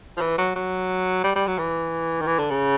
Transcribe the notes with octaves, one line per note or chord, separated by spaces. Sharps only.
F3
E3
F#3
F#3
G3
G3
F#3
E3
D#3
E3
D3
C#3